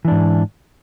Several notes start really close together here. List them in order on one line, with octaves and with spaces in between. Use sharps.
E3 D4 G#2